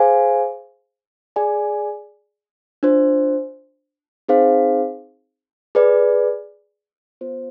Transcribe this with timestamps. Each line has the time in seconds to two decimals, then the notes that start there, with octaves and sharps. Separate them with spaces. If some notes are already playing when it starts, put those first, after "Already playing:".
Already playing: G#4 C5 F5 G#5
1.36 G#4 D5 G#5
2.83 D4 F4 C5
4.29 C4 D#4 G#4 C5 F5
5.75 G#4 B4 D5
7.21 B3 F4 C5